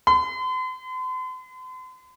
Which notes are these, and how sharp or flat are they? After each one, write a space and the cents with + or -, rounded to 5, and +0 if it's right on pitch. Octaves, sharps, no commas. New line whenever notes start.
C6 -45